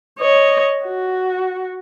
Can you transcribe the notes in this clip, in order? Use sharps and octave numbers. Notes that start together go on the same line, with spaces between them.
C#5 D#5
F#4